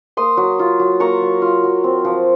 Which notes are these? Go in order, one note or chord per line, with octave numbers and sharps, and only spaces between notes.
A#3 C6 D#6
F#3
F4
F#3
A#3 A#5 C#6
F#3
F4
F#3
C4
F3